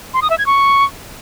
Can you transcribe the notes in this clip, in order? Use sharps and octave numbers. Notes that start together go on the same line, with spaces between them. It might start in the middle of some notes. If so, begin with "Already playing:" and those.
C6
D#6
E5
G#6
C#6